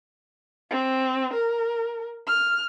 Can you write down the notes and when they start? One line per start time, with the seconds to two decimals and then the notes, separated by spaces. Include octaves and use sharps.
0.70 C4
1.34 A#4
2.27 F6